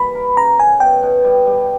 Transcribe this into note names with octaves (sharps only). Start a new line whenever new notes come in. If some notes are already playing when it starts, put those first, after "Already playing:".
Already playing: E3 G3 A#3 B5
A#4
C#3 A#5
C#3 G#5
B2 G5
B2
G3
G3